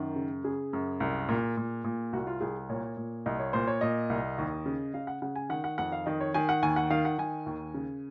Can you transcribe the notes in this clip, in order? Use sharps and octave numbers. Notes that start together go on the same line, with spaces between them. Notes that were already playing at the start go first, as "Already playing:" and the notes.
Already playing: F#2 D#3
C#3
C#3 G#4
F#2
C2
A#2
A#2
A#2
C2 F#4
F4
C2 G#4
A#2 C#5
A#2
C2 D#5
C#5
A#2 C5
C#5
A#2 D#5
C2
D#2
C#3
C#3 F5
F#5
C#3 F#5
G#5
D#3 F#5
F#5
F2 F#5
F5
D#3 D#5
C#5
D#3 G#5
F#5
D#2 G#5
F#5
D#3 F5
F#5
D#3 G#5
D#2
C#3